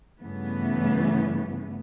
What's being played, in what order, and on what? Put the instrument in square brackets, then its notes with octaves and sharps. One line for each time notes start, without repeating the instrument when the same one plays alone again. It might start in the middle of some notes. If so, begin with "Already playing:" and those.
[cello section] G2 C#3 E3 A3 B3